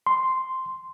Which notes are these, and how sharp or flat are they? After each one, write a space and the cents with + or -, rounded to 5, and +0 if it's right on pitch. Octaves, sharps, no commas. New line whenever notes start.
C6 -5